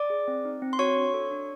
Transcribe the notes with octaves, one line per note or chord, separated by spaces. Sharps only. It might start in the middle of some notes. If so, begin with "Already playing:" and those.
Already playing: D5 D6
G#4
C4
D#4
C4
C6
F#4 C#5 C#6
D4
A4
D4